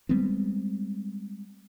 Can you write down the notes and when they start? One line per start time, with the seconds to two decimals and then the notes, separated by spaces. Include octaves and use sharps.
0.09 G3 G#3 B3 C4